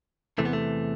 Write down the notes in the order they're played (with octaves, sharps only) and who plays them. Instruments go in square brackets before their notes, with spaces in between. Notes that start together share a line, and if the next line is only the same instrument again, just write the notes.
[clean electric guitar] E2 C3 E3 A3
B3
A3